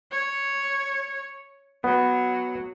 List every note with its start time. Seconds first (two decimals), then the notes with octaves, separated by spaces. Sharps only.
0.11 C#5
1.84 F#3 B3